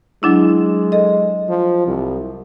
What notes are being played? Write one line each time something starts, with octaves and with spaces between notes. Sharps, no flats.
F#3 G#3 D4 E4
A4 D#5
F3
C2